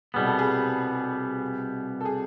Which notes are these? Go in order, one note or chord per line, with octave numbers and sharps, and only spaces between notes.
C2 B2 G3 B3 G#4
A4
G#4
A4
G#4